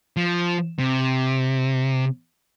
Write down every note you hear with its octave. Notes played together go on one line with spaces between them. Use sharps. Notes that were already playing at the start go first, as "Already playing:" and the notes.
F3
C3